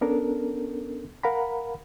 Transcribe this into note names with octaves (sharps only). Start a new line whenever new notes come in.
B3 C#4 D4 A4 A#4
A#4 F5 F#5 A#5 B5